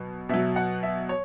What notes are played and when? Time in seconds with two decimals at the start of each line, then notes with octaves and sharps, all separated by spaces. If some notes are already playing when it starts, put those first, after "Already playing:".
Already playing: B2 F#3
0.29 B2 F#3 E5
0.56 F#5
0.83 E5
1.09 C#5